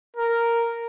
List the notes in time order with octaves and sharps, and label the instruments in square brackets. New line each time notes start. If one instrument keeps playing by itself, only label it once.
[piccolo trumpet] A#4